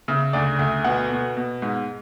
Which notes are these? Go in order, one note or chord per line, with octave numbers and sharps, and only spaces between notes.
C#3 E5
D2 D5
D2 E5
B2 F#5
B2
B2
G#2